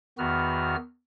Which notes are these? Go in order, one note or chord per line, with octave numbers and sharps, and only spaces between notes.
E2 D#3 B3 F#4 F6